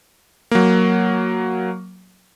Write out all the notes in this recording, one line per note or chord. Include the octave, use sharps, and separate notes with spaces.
F#3 A#3